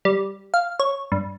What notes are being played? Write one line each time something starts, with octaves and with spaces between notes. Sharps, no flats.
G3
F5
C#5
G2